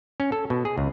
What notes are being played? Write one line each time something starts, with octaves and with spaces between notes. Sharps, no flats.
C#4
A4
B2
G#4
C#2